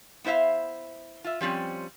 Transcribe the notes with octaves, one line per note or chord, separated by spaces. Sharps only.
B3 E4 C5 E5 F5
F4 E5
F3 G3 C4 C#4